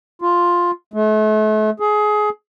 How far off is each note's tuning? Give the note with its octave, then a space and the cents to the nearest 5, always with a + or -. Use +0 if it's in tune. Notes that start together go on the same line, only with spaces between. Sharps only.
F4 +5
A3 -40
G#4 +20